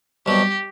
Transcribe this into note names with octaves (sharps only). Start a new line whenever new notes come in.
C2 B2 F#3 G4